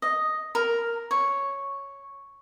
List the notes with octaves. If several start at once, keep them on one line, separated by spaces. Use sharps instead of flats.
D#5
A#4
C#5